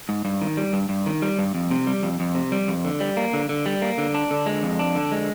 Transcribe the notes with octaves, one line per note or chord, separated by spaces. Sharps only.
G#2
G2
D#3
G3
G2
G2
D#3
G3
G2
F2
C3
G3
F2
F2
C3
G3
F2
D3
G3
A#3
D3
D3
G3
A#3
D3
D4
D3
G#3
F2
D4
D3
G#3